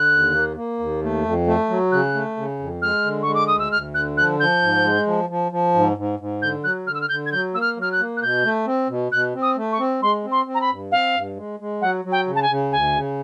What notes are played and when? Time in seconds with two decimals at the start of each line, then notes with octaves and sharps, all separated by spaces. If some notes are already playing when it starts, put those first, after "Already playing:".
Already playing: D3 F#6
0.12 D#2
0.34 A#3
0.57 A#3
0.79 D#2
1.02 A3
1.24 F2
1.47 A3
1.69 F#3
1.92 C#3 F#6
2.14 A3
2.37 C#3
2.59 F2
2.82 G#3 F6
3.04 D3
3.23 G#3 C#6
3.34 D6
3.47 D2 D#6
3.59 E6
3.71 D2 F6
3.94 D3 F#6
4.17 F3 F#6
4.40 F3 G6
4.62 G#2
4.84 G#3
5.06 F3
5.30 F3
5.52 F3
5.74 G#2
5.97 G#2
6.19 G#2
6.42 D3 G6
6.64 F#3 F#6
6.87 D3 F6
6.94 E6
7.01 F6
7.09 D3 G6
7.26 G#6
7.32 F#3 G6
7.54 A#3 E6
7.61 F6
7.77 F#3
7.82 F6
7.92 F#6
7.99 A#3
8.17 F#6
8.22 B2 G6
8.44 A3
8.66 C4
8.89 B2
9.12 B2 F#6
9.35 C4
9.42 D#6
9.56 A3
9.72 C#6
9.79 C4
10.02 G#3 C6
10.24 C4
10.32 C6
10.47 C4
10.55 A#5
10.61 B5
10.70 G2
10.92 C4 F5
11.14 G2
11.37 G#3
11.60 G#3
11.82 F#3 F#5
12.05 F#3
12.12 G5
12.27 C#3
12.35 A5
12.42 G#5
12.50 C#3
12.72 D2 G#5
12.95 C#3